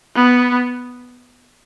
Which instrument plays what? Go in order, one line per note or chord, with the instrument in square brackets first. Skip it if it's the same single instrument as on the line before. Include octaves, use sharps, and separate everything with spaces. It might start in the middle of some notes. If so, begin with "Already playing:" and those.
[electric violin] B3